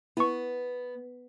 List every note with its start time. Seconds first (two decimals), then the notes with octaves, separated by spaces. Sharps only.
0.17 B3 E4 C#6